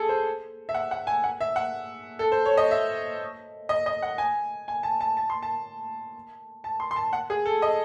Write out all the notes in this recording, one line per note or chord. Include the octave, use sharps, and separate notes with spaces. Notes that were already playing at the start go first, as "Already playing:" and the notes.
Already playing: G#4 A4
C5
E5
F#5
F#5
G#5
F#5
E5
F#5
A4
C5
C#5
D#5
E5
D#5
D#5
F#5
G#5
G#5
A5
A5
A5
C6
A5
A5
C6
C6
A5
F#5
G#4
A4
D#5